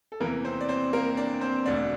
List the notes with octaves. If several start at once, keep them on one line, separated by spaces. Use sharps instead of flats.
A4
E2 C3 E3 A#3 A#4
C4 C5
D5
C4 C5
A#3 A#4
D4 D5
C4 C5
E1 D2 D3 D4 D5